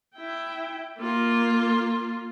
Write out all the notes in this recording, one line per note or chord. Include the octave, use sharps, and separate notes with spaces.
E4 G5
A#3 F4